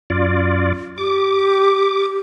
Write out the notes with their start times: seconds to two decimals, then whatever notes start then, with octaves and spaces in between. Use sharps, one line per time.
0.10 F#2 F4 D5
0.98 G4 D6